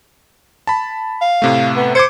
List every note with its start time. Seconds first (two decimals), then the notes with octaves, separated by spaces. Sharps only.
0.67 A5 B5
1.21 F5
1.42 A2 C3 A3
1.76 B3
1.95 C5 D6 G#6 C#7